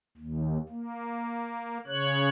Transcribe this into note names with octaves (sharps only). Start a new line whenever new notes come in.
D#2
A#3
C#3 C#5 F#6